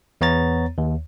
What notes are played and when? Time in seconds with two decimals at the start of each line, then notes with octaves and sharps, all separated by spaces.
0.21 E2 B3 C#5 A#5 A6
0.78 D#2